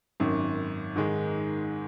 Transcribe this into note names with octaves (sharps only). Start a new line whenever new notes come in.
G#1 F#2 D#3
G#2 D#3 G#3